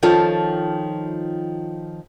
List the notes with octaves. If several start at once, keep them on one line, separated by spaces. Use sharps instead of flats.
D#3 F3 C#4 F4 A4